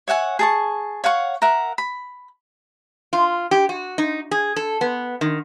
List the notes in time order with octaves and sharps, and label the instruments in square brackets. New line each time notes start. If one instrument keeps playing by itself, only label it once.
[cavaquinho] C#5 E5 F#5 G#5
G#4 A5 C#6
C#5 F5 F#5 C#6
A#4 E5 F#5
B5
[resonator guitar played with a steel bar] F4
G4
F#4
D#4
G#4
A4
B3
D#3